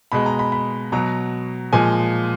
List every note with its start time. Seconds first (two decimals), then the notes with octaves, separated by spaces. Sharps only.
0.12 B2 G#3 B5
0.26 A#5
0.39 B5
0.52 B5
0.92 B2 F#3 A#5
1.73 A#2 F3 G#3 G#5